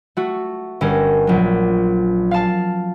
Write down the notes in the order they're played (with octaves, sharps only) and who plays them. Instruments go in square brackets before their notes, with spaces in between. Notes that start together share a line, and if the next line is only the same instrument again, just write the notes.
[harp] A3 F#4
G1 C#4 A#4
A#1 F#3
F5 A5